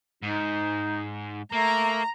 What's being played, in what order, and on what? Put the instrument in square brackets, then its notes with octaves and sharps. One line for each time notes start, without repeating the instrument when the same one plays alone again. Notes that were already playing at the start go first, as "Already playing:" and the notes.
[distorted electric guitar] G#2 [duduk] D#4
[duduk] A3 [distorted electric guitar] A#3 [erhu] A#5